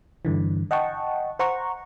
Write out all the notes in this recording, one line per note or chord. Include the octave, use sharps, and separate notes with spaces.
G2 D3 E3
D#5 F#5 G5 A5 C#6
C5 F#5 A#5 C#6